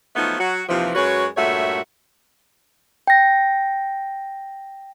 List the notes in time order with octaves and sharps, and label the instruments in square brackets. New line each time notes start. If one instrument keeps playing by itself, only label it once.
[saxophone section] F3 F#3 A3 B3 D#4 F4
F#3 F#4
D#2 C3 E3 F3
F#2 G#3 F#4 B4 C#5
G2 A#2 A3 F#4 C#5 E5
[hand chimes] G5 A#6